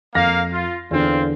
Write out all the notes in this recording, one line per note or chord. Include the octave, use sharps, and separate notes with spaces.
F2 A#3 F5 A#6
F4
E2 D3 C4 F4